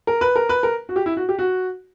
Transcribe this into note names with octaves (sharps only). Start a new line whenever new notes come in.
A#4
B4
A#4
B4
A#4
F#4
G4
E4
F#4
G4
F#4